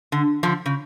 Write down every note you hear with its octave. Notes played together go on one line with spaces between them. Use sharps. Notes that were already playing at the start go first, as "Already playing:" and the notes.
D3
D3 F3
C#3